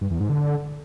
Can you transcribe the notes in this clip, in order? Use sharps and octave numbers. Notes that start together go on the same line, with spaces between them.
G2
E2
G#2
D3